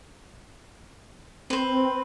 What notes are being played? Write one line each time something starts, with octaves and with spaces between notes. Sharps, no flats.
C4 B4 C5